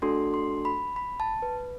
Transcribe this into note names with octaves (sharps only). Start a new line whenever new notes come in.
A3 D4 F#4 A4 C6
C6
B5
B5
A5
B4